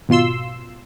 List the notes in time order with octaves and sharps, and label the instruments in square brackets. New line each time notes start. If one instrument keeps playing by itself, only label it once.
[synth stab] G#1 B2 F4 C6 E6